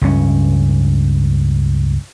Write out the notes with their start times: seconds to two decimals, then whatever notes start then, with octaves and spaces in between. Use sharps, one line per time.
0.01 C#2 G2 C#4